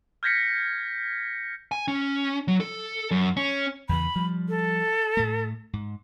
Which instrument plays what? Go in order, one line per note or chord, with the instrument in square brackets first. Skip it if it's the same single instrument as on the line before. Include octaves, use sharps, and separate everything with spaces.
[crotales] F6 G6 G#6 A#6 B6 C#7
[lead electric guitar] G#5
C#4
F#3
A4
F#2
C#4
[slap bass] E2 C#3 E3 [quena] B5
[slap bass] F3 G3
[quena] A4
[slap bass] A2 A3
G#2